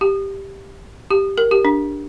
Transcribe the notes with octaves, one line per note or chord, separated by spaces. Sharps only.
G4
G4
A#4
G4
D4